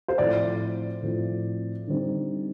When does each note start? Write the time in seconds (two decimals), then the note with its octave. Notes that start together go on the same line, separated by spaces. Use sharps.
0.08 C5
0.18 A2 F3 C4 D5
1.03 A2 F3 C4
1.87 D3 G3 C4 D#4